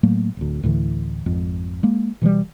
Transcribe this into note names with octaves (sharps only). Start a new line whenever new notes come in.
A2 F#3 A3 A#3
D1 D2
D2 A2 D3 E3
G#1 F2
G#3 A#3
B2 E3 F#3 G3